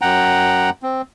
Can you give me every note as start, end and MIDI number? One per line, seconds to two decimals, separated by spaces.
0.01 0.70 42
0.01 0.70 78
0.01 0.70 79
0.01 0.70 82
0.83 1.02 60